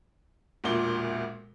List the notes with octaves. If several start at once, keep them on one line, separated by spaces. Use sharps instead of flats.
E1 D2 A#2 G7